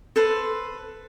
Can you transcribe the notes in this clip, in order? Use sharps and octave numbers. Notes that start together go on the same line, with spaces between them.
A4 B4 C5